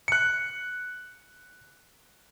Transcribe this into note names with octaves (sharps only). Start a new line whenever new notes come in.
F#6 C#7